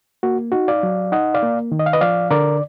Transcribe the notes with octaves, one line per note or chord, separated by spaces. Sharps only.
A#3 F#4
D#4 F#4
D5 F5
F#3
D#4 D#5 F#5
D5 F5
A#3
D#3
D#5
F5
B4 D#5
F3 D5 F5
D3 A#4 D5